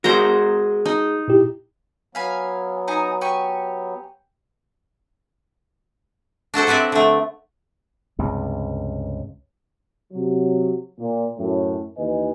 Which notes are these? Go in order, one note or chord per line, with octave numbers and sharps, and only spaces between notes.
G#3 F#4 A#4 C5 A#5
D#4
A#2 E4 G4
F#3 B3 F5 G#5 B5
D#4 G#5 A#5
G4 G#5 C#6
D4 F#4 A4 C5
F#3 C4 B4 D5 E5
D3 A3
C#2 G2 C3
C3 F#3
A#2
F#2 A2
D#2 E3 B4 D#5 G#5